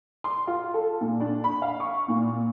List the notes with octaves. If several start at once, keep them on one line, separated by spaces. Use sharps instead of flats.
C6
F4
A4
A#2
D4
B5
F5
C#6
A#2